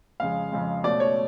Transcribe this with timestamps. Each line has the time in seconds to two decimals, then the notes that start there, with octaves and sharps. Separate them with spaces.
0.20 F2 C#3 G#3 F5
0.52 F2 C#3 G#3
0.84 B2 A3 C#4 D5
1.00 C#5